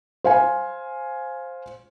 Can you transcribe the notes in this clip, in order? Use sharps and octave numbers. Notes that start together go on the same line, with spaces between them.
C5 F5 G#5